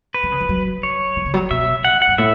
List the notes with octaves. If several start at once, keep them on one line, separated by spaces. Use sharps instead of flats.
B4
E3
C#3
E3
F#3
C#5
E3
C#3
F#3
B2 E5
F#5
F#5
F#2
A2 E5